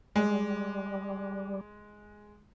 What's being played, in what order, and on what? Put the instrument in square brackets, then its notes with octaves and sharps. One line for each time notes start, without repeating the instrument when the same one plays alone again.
[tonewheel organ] G3 [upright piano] G#3